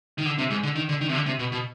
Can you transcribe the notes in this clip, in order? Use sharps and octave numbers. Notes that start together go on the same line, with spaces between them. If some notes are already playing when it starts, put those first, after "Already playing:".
D#3
D3
C3
G#2
D3
D#3
D3
D#3
C3
D3
C3
B2
B2